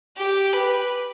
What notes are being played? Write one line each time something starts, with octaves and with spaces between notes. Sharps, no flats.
G4
B4